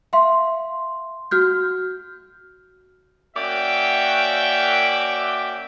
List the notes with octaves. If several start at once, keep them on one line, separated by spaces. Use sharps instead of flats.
E5 F5 C6
F#4 F6 G6
A#3 C#4 F#4 D5 E5 G5